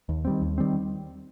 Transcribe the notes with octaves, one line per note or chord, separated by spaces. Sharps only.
D#2
D#3 G3 C4
D#2
D#3 G3 C4